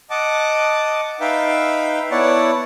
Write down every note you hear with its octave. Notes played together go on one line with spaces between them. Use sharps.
D#5 F#5 A5 D6
D#4 B4 E5 F5 G5
B3 E4 C#5 D5 F#5 A5